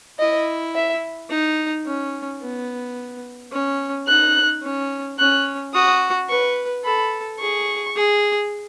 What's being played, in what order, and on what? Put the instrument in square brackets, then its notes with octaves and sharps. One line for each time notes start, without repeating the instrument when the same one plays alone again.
[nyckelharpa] E4 [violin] D#5
[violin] E5
[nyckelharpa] D#4
C#4
B3
C#4
[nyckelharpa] D#4 [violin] F#6
[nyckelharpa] C#4
[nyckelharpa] C#4 [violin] F#6
[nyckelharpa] F#4 [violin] D#6
[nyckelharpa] B4 [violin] C#6
[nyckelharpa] A4 [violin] B5
[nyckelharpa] G#4 [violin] C#6
[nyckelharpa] G#4